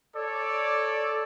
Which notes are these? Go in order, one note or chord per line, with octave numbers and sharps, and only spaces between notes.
A4 C#5 D5